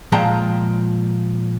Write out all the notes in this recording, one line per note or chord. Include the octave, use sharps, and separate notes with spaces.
A#2 F3 G#3 G5 A5 A#5